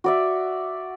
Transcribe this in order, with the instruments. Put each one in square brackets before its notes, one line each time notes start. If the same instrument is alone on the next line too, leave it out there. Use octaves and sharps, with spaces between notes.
[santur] F#4 D5 E5